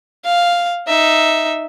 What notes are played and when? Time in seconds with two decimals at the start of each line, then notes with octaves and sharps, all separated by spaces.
0.25 F5
0.87 D#4 E5